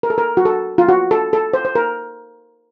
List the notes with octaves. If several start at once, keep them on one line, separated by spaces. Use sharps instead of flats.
A#4
A4
A#4
F#4
A4
F4
F#4
A4
A4
C5
C5
A#4